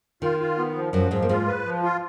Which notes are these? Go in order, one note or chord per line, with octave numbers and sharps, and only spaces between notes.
D#3 F4
F4
B3
F3
F#2 F3 F#3
G#2 F3 G#3
A#3
G#2 G#3 F4
B4
F3
F4